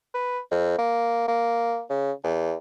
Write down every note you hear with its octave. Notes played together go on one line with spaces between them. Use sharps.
B4
F2
A#3
A#3
C#3
E2